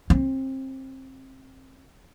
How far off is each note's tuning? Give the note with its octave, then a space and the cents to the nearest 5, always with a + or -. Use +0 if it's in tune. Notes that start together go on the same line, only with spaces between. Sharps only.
C4 +25